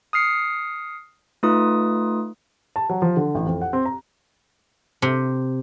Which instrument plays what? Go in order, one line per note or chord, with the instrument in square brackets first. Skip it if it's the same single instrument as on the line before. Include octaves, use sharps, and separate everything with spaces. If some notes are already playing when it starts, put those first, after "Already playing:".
[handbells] D#6 F6 C7 C#7
A3 D#4 F4 B4 D#6
[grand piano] A5
F#3
F3
D3
A1
F2
F#5
C4
A#5
[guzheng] C3